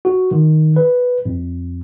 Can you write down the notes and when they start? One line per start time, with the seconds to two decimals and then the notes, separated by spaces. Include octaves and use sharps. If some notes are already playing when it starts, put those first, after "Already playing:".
0.05 F#4
0.31 D#3
0.76 B4
1.25 F2